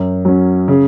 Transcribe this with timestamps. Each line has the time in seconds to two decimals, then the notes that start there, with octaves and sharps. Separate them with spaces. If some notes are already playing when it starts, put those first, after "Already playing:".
Already playing: F#2
0.25 F#3 C#4
0.68 C#3